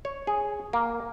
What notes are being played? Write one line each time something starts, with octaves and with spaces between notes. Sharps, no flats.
C#5
G#4
A#3